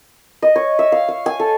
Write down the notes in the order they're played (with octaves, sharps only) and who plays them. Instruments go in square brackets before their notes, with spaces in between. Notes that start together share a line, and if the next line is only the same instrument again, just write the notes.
[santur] D#5
C#5
E5
F5
F5
G#5
A4